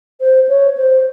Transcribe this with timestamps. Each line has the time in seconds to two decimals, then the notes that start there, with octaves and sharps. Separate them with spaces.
0.20 C5
0.49 C#5
0.77 C5